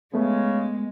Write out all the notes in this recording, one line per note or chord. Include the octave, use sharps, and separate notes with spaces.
C#3 G#3 A3 B3